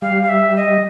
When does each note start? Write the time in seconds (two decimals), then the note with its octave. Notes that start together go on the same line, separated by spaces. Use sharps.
0.02 G3 F5
0.23 F5
0.29 E5
0.56 D#5